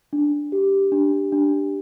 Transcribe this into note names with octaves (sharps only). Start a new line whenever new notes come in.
D4
G4
D4
D4